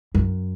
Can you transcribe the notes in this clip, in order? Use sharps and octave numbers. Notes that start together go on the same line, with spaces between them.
F#2